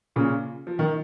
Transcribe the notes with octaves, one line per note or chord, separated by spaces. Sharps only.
A#2 C#3
F3
D#3